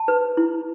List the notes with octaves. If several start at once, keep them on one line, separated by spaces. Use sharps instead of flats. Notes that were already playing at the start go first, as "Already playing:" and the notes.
Already playing: A5
B4
E4